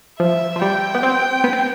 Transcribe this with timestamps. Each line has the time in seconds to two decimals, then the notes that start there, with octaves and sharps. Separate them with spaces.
0.20 F3 E5
0.56 F3
0.62 G3 G5
0.95 B3
1.03 C4
1.44 B3
1.53 C4